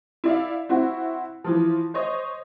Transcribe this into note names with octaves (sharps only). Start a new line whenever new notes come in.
E4 D5 F5
C4 E4 F#4
E3 F3
C5 C#5 D#5